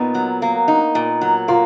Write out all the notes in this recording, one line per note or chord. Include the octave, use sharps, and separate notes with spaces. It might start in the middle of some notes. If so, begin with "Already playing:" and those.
Already playing: A#2 B3 D#4
F#3
A#3
D#4
A#2
F#3
A#3 F4